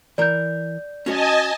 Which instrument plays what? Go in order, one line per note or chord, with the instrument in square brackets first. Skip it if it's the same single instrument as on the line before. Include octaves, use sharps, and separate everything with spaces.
[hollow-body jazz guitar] E3 A#4 [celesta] D5 G6
[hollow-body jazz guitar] C#4 F#4 C#5 [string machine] D#5 G#5 A5